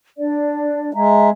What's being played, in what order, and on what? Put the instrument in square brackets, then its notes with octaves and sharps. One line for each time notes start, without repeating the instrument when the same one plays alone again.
[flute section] D4 D5
[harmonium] G#3 [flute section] E5 A#5